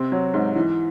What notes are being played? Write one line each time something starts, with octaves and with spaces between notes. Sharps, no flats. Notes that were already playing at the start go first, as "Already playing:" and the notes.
Already playing: C3 C4
F#3
G#2
E3